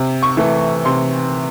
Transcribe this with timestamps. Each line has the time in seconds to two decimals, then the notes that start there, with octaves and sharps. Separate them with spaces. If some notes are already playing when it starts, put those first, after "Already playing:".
Already playing: C3
0.23 C#6
0.37 E3 A3
0.85 C3 C6